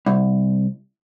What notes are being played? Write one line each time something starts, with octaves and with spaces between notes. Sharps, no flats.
C2